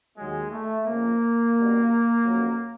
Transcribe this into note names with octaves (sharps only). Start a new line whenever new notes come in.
D#2 D#3 F#3 G#3
A3
F2 C#3 F3 A#3
C#2 B2 G3
F2 C#3 F#3